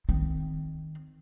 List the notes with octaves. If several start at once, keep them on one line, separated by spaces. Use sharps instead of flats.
D#3 C4